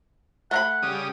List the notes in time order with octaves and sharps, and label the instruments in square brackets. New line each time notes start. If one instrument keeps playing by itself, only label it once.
[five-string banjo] A3 A#5 B5 [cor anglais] F#5
[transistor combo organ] C#3 G3 D#6